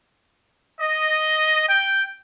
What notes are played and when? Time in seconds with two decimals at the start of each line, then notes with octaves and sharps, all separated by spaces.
0.80 D#5
1.69 G5